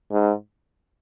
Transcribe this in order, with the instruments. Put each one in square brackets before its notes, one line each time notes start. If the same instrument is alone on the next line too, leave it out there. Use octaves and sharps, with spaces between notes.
[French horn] G#2